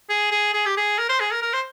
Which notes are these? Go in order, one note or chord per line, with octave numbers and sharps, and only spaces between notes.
G#4
G#4
G#4
G4
G#4
A#4
C5
G#4
A#4
A#4
C5